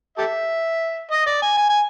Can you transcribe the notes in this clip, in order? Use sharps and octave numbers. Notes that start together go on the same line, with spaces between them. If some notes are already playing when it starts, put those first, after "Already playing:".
G4 A4 E5
D#5
D5
G#5
G#5
G#5